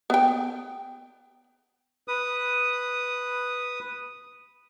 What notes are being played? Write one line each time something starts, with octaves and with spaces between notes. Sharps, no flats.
B3 G5
B4 D#6